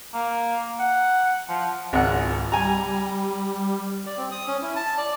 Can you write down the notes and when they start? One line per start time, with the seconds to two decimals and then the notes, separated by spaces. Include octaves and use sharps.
0.14 A#3
0.79 F#5
1.49 F3
1.93 G#1 C#2 F#5
2.52 G3 G#5 A#5
4.06 D5
4.18 C4
4.31 D#6
4.47 C#4
4.62 E4
4.76 A5
4.98 D5